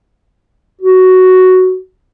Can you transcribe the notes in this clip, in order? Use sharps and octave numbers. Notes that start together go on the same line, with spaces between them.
F#4